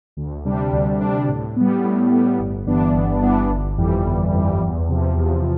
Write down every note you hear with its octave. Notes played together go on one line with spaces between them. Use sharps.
D2
C3 G3 D4
D2
C3 G3 D4
A2
G3 B3
A2
G3 B3
G1
G2 E3 B3 D4
G1
G2 E3 B3 D4
G1
F2 E3 G3
G1
F2 E3 G3
E2
C3 F3
E2